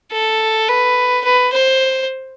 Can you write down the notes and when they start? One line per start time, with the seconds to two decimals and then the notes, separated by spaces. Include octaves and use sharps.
0.12 A4
0.69 B4
1.25 B4
1.53 C5